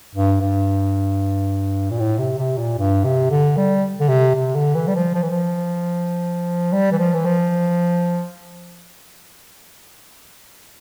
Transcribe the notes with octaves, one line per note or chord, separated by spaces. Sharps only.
G2
G2
A#2
A2
C3
C3
A#2
G2
C3
D3
G3
D3
C3
C3
D3
E3
G3
F3
F3
E3
F3
G3
E3
F3
E3
F3